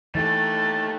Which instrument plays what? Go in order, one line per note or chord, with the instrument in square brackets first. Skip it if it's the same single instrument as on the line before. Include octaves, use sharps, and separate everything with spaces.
[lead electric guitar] D#3 G4 [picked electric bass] E3 [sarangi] A3 [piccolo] A6